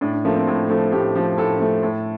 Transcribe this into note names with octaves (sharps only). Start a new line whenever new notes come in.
A2 D4
D4
F3 A3 A#3
C4
A2
F3 A3
A2 G4
F3 A3
A2 A4
F3 A3
A2